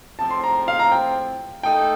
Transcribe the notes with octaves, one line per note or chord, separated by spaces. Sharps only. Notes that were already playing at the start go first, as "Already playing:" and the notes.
A2 F3 C4 A5
C6
A#5
F5
A#5
G5
A3 D#4 A4 G5